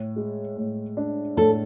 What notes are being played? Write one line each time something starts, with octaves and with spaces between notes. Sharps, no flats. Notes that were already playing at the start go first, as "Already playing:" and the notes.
Already playing: A2
G#3
A2
D4
A2 A4